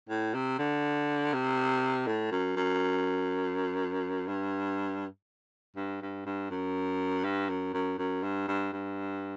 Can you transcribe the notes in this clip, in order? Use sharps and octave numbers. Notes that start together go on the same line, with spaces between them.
A2
C3
D3
C3
A2
F#2
F#2
G2
G2
G2
G2
F#2
G2
F#2
F#2
F#2
G2
G2
G2